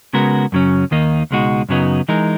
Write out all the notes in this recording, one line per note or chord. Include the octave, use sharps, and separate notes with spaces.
C#3 G#3 B3 F#4 A#4
F#2 C#3 F#3 C#4
D#2 D#3 A#3 D#4
C#2 B2 G#3 D#4 F#4
F#2 C#3 F#3 B3 D#4
E3 G#3 D#4 A#4